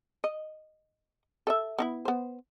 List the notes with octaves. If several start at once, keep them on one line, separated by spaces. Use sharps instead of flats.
D#5
A4 D#5 E5
B3 D#4 E4
B3 C5